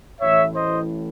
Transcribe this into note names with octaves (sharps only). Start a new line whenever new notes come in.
A1 A2 E3 C#5 E5
C5 D#5